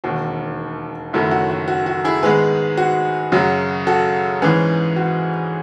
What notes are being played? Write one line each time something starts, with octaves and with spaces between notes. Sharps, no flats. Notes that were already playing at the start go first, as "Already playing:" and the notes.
E1 D#2 D#3 F#4
F#1 F#2 D#3 F#3 A3 E4
F#4
F#4
F#4
F#4
E4 G#4
G#2 D#3 G#3 B3 G#4 B4
F#4
F#2 C#3 F#3
F#4 A4
G#2 E3 G#3 C#4 G#4 B4
F#4